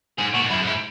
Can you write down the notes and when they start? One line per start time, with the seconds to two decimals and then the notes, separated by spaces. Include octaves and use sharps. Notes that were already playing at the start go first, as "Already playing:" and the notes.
0.18 G#2 G#4
0.34 A#2 F#4
0.43 G#2
0.50 F#2 E4
0.62 G#2
0.68 E4